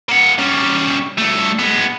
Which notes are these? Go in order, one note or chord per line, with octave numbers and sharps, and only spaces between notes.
A#3 F#5
G3 C#4
G2 A3
G#3 B3